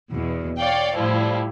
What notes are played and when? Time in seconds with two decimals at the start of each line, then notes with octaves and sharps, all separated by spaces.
0.12 E2 B2
0.58 C#5 D5 F5 G5
0.96 A2 F3 G3 E4